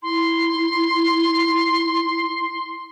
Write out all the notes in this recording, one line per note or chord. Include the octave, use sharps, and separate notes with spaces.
E4 C6